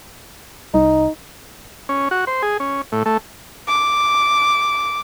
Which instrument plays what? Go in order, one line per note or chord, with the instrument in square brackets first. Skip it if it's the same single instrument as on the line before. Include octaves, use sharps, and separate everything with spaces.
[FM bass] C2 [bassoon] D#4
[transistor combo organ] C#4
F#4
C5
G#4
C#4
A2
A3
[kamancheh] D6